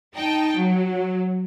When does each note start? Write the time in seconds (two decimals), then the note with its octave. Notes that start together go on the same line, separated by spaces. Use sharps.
0.15 D#4 G5 A5
0.56 F#3